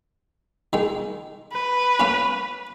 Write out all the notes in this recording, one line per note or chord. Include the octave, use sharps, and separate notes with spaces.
D#3 G#3
B4
A#3 C#4